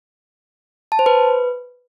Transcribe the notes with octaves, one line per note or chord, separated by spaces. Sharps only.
A5
C5
B4